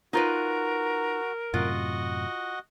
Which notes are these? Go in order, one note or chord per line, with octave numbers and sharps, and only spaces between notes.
D#4 F4 F#4 A#4 B4
F#2 A2 C3 F4 F#4 D#5 F#5